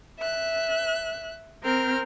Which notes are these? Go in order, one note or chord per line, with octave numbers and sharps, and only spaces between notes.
E5 F#6
C4 A#4 F6 G6